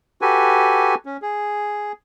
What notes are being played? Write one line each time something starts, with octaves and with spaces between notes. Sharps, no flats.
F#4 G4 A4 B4 G#5
C#4
G#4